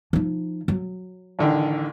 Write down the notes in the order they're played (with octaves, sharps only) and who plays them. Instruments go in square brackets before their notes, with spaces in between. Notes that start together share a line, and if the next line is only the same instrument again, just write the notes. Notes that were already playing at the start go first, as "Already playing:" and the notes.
[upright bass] F3 D#4
F#3
[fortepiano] A1 D3 D#3